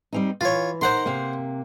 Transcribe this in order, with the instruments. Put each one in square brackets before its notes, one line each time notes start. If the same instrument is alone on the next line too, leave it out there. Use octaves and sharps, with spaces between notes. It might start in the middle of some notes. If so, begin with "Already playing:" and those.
[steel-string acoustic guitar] G3 C4 D#4
[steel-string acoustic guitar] E3 [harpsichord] F4 C#5
[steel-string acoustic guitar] D#4 A#4 [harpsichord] C5 F#5 C6
[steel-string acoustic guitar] C3 A#3